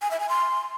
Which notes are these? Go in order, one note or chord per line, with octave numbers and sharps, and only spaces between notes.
G#5
E5
G#5
C6